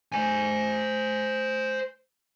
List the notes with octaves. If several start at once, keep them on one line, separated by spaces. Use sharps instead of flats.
C5 G#5